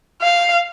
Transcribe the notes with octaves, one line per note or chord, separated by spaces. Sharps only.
F5